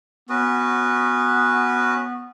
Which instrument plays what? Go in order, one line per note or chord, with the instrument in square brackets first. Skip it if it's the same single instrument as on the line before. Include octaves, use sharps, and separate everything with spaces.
[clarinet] B3 [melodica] C#4 F#4 B4